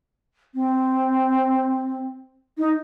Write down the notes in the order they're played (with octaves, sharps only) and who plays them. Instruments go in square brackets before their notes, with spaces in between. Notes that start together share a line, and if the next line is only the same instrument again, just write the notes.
[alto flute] C4
D#4